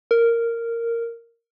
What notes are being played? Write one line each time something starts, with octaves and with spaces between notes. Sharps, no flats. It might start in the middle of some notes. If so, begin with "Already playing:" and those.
A#4